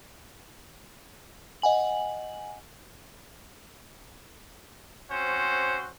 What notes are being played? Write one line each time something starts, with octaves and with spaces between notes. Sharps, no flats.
D#5 F#5 G#5 F#7
C4 C#4 F#4 C5